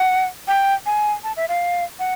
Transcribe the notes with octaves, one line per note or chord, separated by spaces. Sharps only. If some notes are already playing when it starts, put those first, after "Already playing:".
Already playing: F#5
G5
G#5
A5
E5
F5
F#5